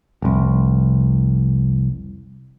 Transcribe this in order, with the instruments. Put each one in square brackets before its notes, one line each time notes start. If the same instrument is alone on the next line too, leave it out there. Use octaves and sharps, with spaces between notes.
[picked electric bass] F1 C2